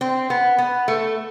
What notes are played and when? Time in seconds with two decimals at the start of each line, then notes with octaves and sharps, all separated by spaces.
0.01 C4
0.30 B3
0.58 B3
0.88 A3